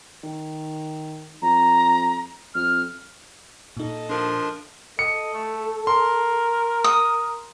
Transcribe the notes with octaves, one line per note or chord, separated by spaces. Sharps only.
D#3
F2 A#5
F2 F6
A#2 D#4 A4 D#5
F3 D4 A#4
A4 D#5 C#7
A3
A#4 C6
D#6